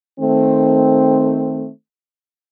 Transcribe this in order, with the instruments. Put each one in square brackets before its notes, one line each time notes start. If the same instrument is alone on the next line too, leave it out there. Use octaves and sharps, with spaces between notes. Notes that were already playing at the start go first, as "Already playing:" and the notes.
[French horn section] D#3 A3 C4